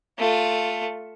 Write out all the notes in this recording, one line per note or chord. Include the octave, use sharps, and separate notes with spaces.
A3 F4